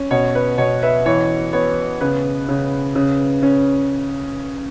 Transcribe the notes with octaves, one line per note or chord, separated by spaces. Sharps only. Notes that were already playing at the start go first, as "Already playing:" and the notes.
Already playing: C#4
B2 C#5
B4
B2 C#5
B4 E5
E3 C#5
B3 C#5
C#3 B4
C#3
C#3
C#4